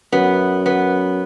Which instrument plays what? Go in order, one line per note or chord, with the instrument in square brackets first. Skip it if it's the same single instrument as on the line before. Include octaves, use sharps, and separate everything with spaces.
[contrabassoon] F#2 [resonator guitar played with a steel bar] B3
[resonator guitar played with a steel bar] B3